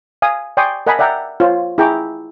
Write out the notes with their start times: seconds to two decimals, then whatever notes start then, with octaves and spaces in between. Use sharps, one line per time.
0.22 F5 G#5 D#6
0.57 D5 G5 G#5 C6 C#6 D#6
0.87 A#4 D#5 F#5 G#5 A5 B5
0.99 D5 E5 F#5 G5 A#5
1.40 F4 C5 C#5
1.78 E4 G#4 G5 A#5 C#6 D6